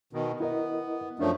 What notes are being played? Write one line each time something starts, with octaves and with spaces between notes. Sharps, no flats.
B2 D#3
B3 E4 A#4 D#5
F#2 F3 A3 D4 A#4 C#5